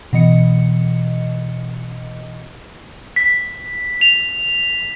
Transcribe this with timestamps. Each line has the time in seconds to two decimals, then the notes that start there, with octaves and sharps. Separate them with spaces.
0.13 B2 E3 D#5 C#7
3.16 B6
4.01 F7